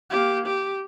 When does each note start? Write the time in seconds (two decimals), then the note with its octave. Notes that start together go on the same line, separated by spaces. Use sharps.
0.10 A#3 G4
0.46 G4